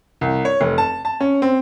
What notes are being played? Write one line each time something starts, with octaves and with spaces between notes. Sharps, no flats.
C2
C#5
F1
A5
A5
C#4
C4